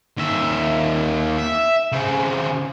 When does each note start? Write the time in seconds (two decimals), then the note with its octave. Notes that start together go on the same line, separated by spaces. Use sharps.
0.17 D#2 E5
1.38 E5
1.92 C#3 C4